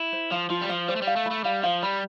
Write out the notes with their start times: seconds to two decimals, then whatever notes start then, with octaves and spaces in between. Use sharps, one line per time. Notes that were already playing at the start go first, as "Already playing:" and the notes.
Already playing: E4
0.13 C5
0.31 F3 F5
0.50 F3 F4
0.61 G3
0.69 F3 F5
0.88 G3 C5
0.96 A3
1.02 G3
1.07 F5
1.16 A3
1.26 B5
1.31 A3
1.44 G3 F5
1.63 F3 F5
1.83 G3 B5